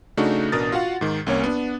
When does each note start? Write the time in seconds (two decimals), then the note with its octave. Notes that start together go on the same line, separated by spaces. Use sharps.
0.17 C#3 A3 D4 D#4 F#4
0.52 A1 B2 D4 A#4 D#6 A6
0.72 F4 F#4 F5 F#5
1.01 G#2 D#3
1.27 C2 A#3 C#4 C#5
1.44 B3 D4